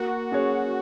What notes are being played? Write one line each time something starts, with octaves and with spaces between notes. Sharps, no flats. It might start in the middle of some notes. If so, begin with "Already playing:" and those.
Already playing: A#3 F#4
C#4 G#4 C#5